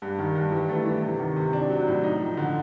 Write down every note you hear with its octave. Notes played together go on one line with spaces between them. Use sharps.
G2
D#3
G2
E3
A3
E3
C3
D#3
C3
D4
F#3
A2
D#4
F3
D3